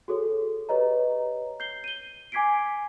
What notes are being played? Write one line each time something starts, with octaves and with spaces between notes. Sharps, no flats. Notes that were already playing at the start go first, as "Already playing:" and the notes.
F#4 G#4 A4 C#5
G4 B4 C#5 D#5 A#5
G6 C7 G7
D#7 G7
G#5 D6 G#6 B6 C7 D7